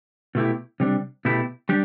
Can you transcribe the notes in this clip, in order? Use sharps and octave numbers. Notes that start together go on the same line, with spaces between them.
B2 A3 E4 G4
C3 G3 D4
B2 A3 E4 G4
G3 D4 G4